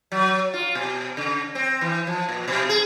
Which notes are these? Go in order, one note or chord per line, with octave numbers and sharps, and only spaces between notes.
F#3
F4
B2
C#3
C4
E3
F3
A#2
B2
G#4